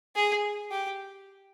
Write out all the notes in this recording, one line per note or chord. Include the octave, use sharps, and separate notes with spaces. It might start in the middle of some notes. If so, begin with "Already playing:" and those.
G#4
G4